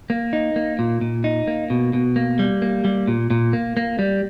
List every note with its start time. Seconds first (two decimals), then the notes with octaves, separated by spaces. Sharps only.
0.10 A#3
0.33 D#4
0.56 A#3
0.79 A#2
1.01 A#2
1.24 D#4
1.47 A#3
1.70 B2
1.93 B2
2.16 A#3
2.39 G3
2.62 A#3
2.85 G3
3.08 A#2
3.30 A#2
3.53 A#3
3.77 A#3
3.99 G3